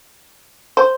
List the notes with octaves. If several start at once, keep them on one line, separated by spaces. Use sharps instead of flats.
C5